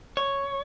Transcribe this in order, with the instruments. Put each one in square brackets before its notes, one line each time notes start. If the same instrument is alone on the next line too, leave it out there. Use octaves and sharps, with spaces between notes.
[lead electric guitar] C#5